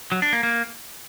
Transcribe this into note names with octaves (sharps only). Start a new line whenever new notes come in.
F#3
D4
A#3
A#3